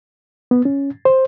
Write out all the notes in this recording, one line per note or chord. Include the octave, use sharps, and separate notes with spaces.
B3
C#4
C5